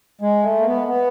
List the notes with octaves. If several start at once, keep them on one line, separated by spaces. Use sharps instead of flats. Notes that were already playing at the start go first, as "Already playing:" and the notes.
G#3
A3
A#3
B3
B3